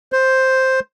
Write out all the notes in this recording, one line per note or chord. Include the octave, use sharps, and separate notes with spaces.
C5